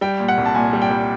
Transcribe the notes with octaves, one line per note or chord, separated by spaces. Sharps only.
G3 G5
A#2
F#5
C2
A5
A#2 G#5
G3
G5
G3